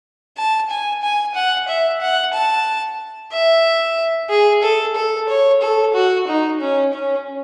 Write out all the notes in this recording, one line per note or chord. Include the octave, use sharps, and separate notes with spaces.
A5
G#5
G#5
F#5
E5
F#5
A5
E5
G#4
A4
A4
C#5
A4
F#4
D#4
C#4
C#4